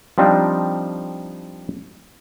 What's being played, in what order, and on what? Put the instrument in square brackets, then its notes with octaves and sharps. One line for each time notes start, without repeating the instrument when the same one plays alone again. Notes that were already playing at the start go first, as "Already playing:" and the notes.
[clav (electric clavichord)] F3 G3 C4 D4 D#4